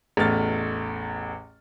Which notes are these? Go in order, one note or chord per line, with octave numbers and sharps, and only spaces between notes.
A1 E2 A3 F6 A6